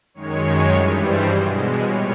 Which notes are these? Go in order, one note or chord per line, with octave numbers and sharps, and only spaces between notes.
F#2 D#3 G#3 C#5
G2 E3 G3
C5
B2 G#3
A#2 G3 C#5